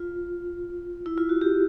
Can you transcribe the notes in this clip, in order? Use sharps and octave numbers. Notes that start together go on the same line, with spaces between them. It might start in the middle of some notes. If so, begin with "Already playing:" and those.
Already playing: F4
E4
F4
F#4
G4